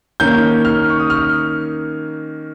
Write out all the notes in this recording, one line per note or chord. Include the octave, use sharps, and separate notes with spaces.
D#3 A#3 C#4 G6
F6
C#6
D#6
F6